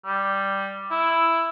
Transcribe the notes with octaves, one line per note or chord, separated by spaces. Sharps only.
G3
E4